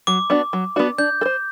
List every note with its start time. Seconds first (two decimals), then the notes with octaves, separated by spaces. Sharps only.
0.07 F#3 D6
0.30 B3 D4 F#4
0.53 F#3
0.76 B3 D4 F#4
0.98 D4 G6
1.21 A4
1.25 C5